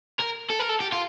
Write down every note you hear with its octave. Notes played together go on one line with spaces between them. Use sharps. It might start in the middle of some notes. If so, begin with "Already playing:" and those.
A#4
A4
A#4
A4
G4
F4